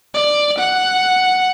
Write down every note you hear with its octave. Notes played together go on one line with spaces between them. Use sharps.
D5
F#5